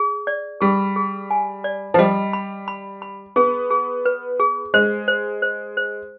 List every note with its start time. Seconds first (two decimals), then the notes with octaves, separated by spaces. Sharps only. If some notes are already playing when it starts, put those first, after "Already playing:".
Already playing: G#4
0.27 D5
0.61 G3 G#4
0.96 G#4
1.30 G#5
1.64 D5
1.94 F3
1.98 G3 D#5
2.33 B5
2.68 B5
3.02 B5
3.36 B3 G#4
3.71 G#4
4.06 B4
4.40 G#4
4.74 G#3 C5
5.08 C5
5.42 C5
5.77 C5